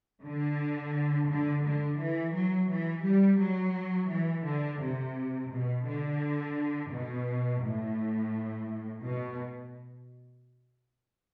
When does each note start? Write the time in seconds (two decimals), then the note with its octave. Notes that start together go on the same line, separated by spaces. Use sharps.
0.22 D3
1.27 D3
1.63 D3
1.97 E3
2.33 F#3
2.68 E3
3.03 G3
3.39 F#3
4.09 E3
4.45 D3
4.80 C3
5.50 B2
5.86 D3
6.91 B2
7.62 A2
9.03 B2